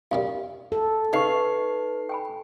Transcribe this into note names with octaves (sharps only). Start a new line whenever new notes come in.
B1 F#2 G3 F5
A4
C#3 D#4 B4 D#5 C#6 C7
G5 G#5 B5